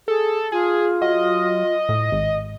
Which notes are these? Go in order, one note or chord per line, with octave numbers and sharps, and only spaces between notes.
G#4 A4
F4 G#4
F#3 D#5
A2
G#1